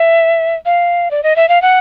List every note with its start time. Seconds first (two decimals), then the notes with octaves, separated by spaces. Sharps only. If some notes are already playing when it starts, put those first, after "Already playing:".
Already playing: E5
0.66 F5
1.11 D5
1.23 D#5
1.36 E5
1.49 F5
1.62 F#5